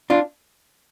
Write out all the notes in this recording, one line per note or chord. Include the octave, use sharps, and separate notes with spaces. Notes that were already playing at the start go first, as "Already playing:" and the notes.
D4 F4